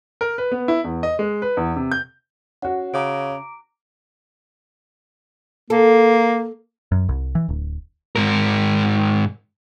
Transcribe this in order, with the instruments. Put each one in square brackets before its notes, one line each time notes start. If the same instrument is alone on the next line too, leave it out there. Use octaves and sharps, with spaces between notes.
[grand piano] A#4
B4
B3
E4
E2
D#5
G#3
B4
E2
C3
G6
[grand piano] C#4 F#4 [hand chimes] F#5
[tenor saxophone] C#3 [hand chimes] A#5 D6 D7
[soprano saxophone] A#3 [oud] A4
[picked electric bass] F#2
C2
E3
D1
[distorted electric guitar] G#2 A#4